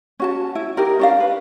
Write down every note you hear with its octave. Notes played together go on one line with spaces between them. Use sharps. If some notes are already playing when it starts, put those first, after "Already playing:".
C#4 F#4 A5
E4
D#4 G4 A#4
C#4 D4 F5
B4